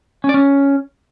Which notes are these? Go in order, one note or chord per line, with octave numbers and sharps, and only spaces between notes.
C#4
D5
C#4